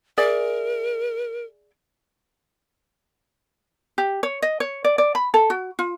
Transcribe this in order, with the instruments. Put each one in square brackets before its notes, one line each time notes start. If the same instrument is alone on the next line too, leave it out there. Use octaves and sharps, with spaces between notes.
[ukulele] G#4 D5 E5 [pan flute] A#4
[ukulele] G4
C#5
D#5
C#5
D5
D5
B5
A4
F#4
F4